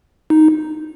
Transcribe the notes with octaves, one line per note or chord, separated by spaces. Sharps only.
D#4